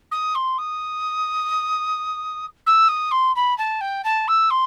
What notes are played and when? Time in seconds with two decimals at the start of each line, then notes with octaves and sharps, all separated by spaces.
0.11 D#6
0.35 C6
0.58 D#6
2.66 E6
2.88 D#6
3.11 C6
3.36 B5
3.58 A5
3.81 G5
4.04 A5
4.28 E6
4.50 C6